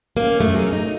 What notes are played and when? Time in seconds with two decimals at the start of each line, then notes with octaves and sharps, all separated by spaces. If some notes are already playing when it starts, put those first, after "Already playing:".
0.17 A#3 C#4
0.41 F#2 A3
0.54 F#3 C#4 G#4
0.73 D#4